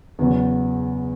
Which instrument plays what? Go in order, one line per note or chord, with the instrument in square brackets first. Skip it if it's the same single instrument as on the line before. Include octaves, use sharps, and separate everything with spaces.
[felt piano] E2 C#3 F#3